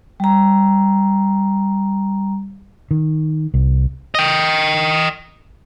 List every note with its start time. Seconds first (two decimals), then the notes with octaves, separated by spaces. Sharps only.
0.20 G3 A#5
2.91 D#3
3.54 C2
4.15 D#5 G5